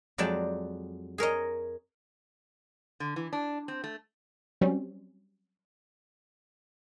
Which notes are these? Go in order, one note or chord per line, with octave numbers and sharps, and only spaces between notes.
F2 F#3 G#3 D5 G5 A5
G#4 A#4 C#5 D#5
D3
E3
D4
C4
A3
F#3 G3 C4 C#4